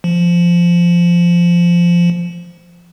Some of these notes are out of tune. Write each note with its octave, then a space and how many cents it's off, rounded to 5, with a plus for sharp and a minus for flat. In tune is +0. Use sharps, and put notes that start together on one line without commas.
F3 -10